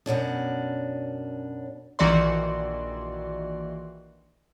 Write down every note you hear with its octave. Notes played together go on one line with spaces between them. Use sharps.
F#2 B2 C#4 D4
A#1 D#3 E3 F#4 D5 C6